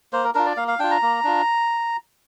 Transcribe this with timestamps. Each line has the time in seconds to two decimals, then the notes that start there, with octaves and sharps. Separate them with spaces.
0.13 A#3 C5
0.24 A#4
0.35 D4 F4 A#4
0.46 D5
0.57 A#3 F5
0.68 F5
0.79 D4 F4 G5
0.91 A#5
1.02 A#3
1.24 D4 F4